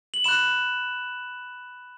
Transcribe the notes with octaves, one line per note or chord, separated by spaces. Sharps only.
F#7
B5 F#6 E7